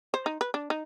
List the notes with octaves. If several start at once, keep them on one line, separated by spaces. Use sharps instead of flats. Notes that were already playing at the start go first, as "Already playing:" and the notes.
C5
D#4
B4
D4
D#4